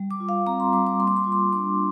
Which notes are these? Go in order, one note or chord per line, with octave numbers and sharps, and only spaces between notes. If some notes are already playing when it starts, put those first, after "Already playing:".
Already playing: G3
D6
F4
F5
C4 A#5
C6
G3 D6
D6
A#3 C6
D6
C6
F4 D6
C6
D4 D6